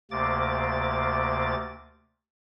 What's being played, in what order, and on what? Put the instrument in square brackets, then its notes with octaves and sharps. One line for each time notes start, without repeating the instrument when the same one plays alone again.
[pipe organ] D2 C3 A#3 D6 A6